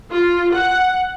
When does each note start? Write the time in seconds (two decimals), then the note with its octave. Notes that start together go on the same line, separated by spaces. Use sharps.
0.11 F4
0.53 F#5